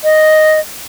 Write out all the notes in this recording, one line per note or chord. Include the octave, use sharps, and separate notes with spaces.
D#5